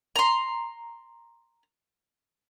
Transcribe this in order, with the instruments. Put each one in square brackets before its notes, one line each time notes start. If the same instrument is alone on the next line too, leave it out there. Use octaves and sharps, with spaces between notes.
[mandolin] A#5 C6